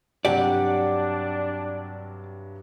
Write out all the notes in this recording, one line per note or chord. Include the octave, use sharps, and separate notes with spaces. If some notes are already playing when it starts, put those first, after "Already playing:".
G2 C3 F#3 D4 G4 D5 F#5